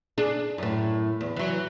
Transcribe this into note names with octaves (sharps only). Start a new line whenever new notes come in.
D4 G#4
F#2 A2
E2
E3 F#3